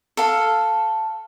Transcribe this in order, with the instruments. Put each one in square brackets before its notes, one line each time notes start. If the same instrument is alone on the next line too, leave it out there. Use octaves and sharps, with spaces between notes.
[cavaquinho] A4 F5